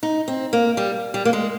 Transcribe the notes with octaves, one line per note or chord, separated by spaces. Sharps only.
D#4
C4
A#3
G3
G3
A#3
G#3